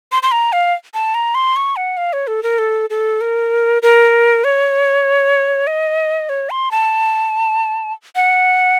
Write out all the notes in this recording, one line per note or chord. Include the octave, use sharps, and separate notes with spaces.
C6
C6
A#5
F5
A5
A#5
C6
C#6
F#5
F5
C#5
A4
A#4
A4
A4
A#4
A#4
C#5
D#5
C#5
C6
A5
F#5